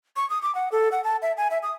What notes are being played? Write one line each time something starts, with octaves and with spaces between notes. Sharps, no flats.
C#6
D#6
D6
F#5
A4
F#5
A5
E5
G#5
E5
D#6